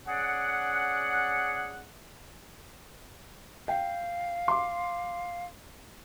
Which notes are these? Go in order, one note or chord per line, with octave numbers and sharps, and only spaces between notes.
C#4 G#4 D5 F#5
F5 G5
C6 D6